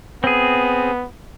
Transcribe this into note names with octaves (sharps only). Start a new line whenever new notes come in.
B3 C4 G#4